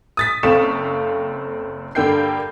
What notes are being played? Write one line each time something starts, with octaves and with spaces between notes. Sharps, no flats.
D#6 A6 B6
F#1 C4 A4 F5 C#6 E7
G2 D3 A#3 G5 G6 C7